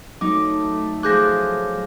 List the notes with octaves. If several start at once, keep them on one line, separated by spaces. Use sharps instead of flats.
F#3 A3 D#4 D6
F3 G#4 D6 F#6 G6 A#6